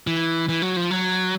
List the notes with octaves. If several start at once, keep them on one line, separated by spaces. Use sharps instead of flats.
E3
E3
F#3
F3
F#3